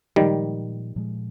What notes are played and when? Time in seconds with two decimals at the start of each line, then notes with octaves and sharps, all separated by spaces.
0.16 A#2 D#3 F3 G3 G#3
0.96 A#2 F3 G#3